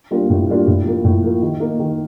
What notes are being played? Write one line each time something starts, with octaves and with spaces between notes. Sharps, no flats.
G3 A#3 D4 F4
A2
G3 A#3 D4 F4
A2
F3 A#3
A2
F3 A#3
D#3
A#3 D#4
D#3